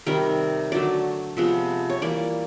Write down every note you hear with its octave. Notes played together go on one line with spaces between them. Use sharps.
C3 D#3 G3 A#4
D3 F#3 A3 D5
C3 F3 G#3 B3
C#5
E3 G3 A#3 D5